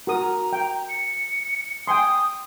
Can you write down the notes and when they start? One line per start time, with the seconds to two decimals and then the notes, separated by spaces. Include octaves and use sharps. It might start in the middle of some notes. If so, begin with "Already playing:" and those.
0.07 F#4 A#4 A#5 D#6
0.53 G5
0.89 C#7
1.87 G5 G#5 C6 D#6